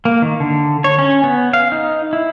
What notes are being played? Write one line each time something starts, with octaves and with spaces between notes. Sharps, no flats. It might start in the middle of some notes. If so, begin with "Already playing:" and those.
A#3
D#3
D3
C#5
C#4
B3
F5
D#4
E4